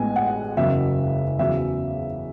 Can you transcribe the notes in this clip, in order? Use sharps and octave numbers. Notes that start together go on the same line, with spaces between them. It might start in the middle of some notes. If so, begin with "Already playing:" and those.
Already playing: A1 A2 G#3 B3 G#5
F#5
F#1 E2 C#3 F#3 E5
E2 C#3 F#3 B3 E5